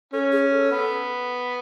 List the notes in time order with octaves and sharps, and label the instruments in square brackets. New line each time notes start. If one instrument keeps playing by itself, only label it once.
[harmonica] C#4 [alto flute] A4
[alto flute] G#4
A4
[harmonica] B3